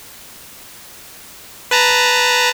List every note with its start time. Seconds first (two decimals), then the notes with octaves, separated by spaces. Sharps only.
1.71 B4 A5 A#5